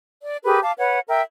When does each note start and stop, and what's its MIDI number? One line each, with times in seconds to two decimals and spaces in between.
0.22 0.37 74
0.44 0.60 67
0.44 0.60 68
0.44 0.60 70
0.44 0.60 71
0.62 0.72 77
0.62 0.72 81
0.62 0.72 86
0.78 0.99 71
0.78 0.99 73
0.78 0.99 78
1.08 1.21 70
1.08 1.21 76
1.08 1.21 79